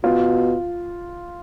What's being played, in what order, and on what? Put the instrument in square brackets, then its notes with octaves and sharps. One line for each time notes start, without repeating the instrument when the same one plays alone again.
[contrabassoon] B2 [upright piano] F4